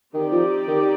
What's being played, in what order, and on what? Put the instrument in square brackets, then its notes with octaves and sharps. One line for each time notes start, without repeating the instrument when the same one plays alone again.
[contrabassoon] D#3 [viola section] C4 D#4 G4 D5
[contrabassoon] F3
D#3